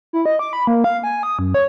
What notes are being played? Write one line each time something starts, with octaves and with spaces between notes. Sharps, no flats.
E4
D#5
D6
B5
A#3
F5
G#5
D#6
F#2
C#5